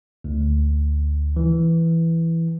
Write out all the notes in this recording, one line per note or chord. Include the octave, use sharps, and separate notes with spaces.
D2
E3